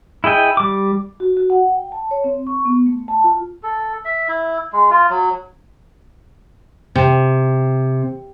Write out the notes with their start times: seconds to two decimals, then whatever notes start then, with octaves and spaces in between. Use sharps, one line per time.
0.24 E4 G#4 D#5 G5
0.57 G3 D6
1.20 F#4
1.37 F#4
1.50 F#5
1.75 G5
1.92 A5
2.11 C#5
2.24 C4
2.47 C#6
2.65 B3
2.86 A3
3.08 A5
3.24 F4
3.63 A4
4.05 E5
4.29 E4
4.73 G#3
4.91 F4
5.10 F#3
6.95 C3